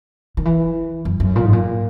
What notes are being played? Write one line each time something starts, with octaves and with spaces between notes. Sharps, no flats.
D#3
E3
F#2
F#2
A#2
G#2
A#2